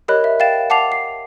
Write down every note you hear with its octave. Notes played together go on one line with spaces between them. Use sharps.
G4 A#4 C#5 D#5 B5 F#6
E5
F5 G5 A6 E7
F#5 A5 D6 C7 F7
C7